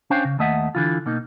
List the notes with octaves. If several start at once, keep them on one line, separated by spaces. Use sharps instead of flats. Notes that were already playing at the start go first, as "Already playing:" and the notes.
C#4 D4 C5 C#5 F5 G5
C#3
D#2 A3 D#5 E5 F#5
D3 E3 F4
B2 A#3 D#4